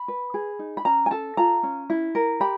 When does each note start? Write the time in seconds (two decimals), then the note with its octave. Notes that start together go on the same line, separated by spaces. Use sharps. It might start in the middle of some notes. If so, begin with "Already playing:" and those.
Already playing: B5
0.08 B4
0.34 G#4
0.59 D#4
0.77 B5
0.85 C#4 A#5
1.06 G#5
1.11 A4 A5
1.37 F4 A#5
1.63 C#4
1.90 E4
2.15 A#4
2.40 G4 B5